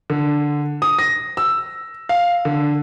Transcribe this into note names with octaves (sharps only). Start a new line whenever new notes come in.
D3
D#6
A#6
E6
F5
D3